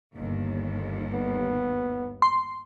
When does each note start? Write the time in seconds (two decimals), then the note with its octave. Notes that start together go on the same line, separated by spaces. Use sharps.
0.15 G1 D#2
1.14 B3
2.22 C6